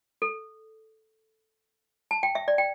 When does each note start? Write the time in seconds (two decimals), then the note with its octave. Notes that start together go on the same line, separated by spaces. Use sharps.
0.22 A4
2.11 A5
2.23 G5
2.35 E5
2.48 D5
2.58 G5